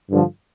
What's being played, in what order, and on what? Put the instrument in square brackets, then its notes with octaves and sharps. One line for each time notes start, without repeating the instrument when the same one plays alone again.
[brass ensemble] G2 D3 F3